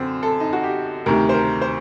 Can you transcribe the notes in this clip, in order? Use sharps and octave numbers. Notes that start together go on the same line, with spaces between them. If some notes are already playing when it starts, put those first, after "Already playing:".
Already playing: F#2 D3 C4
A4
D#4
F#4
G4
D2 C3 D#3 A#4
C5
A#4
C5